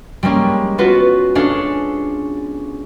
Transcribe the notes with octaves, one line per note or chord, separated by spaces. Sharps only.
G3 G#3 A#3 C#4
B3 C#4 F4 F#4 B4
C#4 D4 G#4 A4 F5